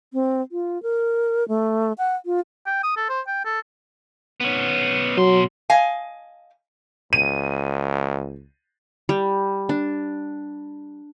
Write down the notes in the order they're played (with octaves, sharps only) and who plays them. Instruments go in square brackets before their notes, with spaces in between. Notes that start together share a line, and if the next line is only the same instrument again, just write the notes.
[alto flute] C4
F4
A#4
A3
F#5
F4
[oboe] G5
D#6
A4
C5
G5
A4
[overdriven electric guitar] B3 C#4
[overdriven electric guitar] B2 C6 [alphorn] F#3
[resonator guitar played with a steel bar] D#5 F5 G#5
[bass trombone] C#2 [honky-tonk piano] D#7
[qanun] G3
D4